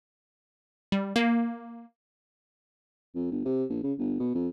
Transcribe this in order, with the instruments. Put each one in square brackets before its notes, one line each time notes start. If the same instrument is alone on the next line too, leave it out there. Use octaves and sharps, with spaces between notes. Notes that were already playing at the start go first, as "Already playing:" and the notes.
[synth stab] G3
A#3
[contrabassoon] F2
G1
C3
A#1
C#3
G1
B2
F2